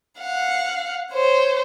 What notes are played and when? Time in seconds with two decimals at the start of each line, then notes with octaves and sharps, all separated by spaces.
0.20 F5 F#5
1.11 C5 C#5